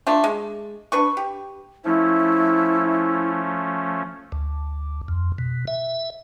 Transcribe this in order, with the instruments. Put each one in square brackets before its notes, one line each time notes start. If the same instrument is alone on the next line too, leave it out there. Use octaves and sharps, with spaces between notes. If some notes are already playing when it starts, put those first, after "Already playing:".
[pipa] A3 D4 F4
G#3
D4 B4 C#6
G4
[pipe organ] F3 A3 C#4 [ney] E4
[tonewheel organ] D2
F2
B2
E5